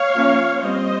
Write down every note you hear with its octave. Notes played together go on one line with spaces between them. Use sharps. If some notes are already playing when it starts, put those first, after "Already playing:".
Already playing: C#5 F5
F3 A#3 C#4
G3 C4 C5 D#5